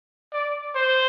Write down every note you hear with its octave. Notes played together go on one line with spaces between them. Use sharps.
D5
C5